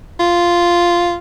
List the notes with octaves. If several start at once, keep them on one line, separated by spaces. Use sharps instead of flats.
F4